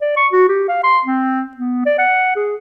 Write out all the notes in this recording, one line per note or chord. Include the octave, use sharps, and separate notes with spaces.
D5
C#6
F#4
G4
F5
C6
C4
B3
D5
F#5
G#4